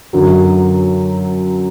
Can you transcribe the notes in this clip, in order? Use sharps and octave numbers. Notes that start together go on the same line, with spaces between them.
F#2 D3 F#3